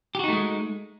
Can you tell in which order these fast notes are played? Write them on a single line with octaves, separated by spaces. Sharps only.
G4 F#4 D#4 A3 G#3